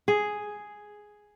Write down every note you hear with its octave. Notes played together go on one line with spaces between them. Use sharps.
G#4